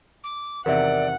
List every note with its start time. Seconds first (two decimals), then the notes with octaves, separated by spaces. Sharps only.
0.24 D6
0.66 E2 C3 D#3 A#4 D5 E5 F#5